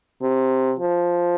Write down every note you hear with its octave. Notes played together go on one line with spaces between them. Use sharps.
C3
F3